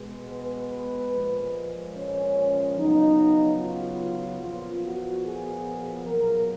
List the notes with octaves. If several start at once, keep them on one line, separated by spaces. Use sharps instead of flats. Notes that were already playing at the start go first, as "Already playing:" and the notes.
Already playing: B2 G#3 B3
B4
A#2 F3 G#3
C#4
C#3 F#3 B3 D#4
F4
A#2 F3 B3 F4
F#4
G#4
B2 F#3 A#3 A#4